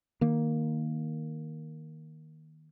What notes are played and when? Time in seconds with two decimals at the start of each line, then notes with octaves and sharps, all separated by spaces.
0.21 D#3 A#3